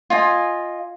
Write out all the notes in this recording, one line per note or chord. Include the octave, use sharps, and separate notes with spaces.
F4 D#5 G#5